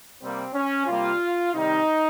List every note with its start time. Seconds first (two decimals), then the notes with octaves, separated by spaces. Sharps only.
0.20 C3 G3 A#3 C4
0.54 C#4
0.87 C3 G3 A#3 F4
1.54 C3 D#3 G3 D#4